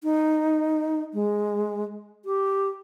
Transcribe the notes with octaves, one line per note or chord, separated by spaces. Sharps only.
D#4
G#3
G4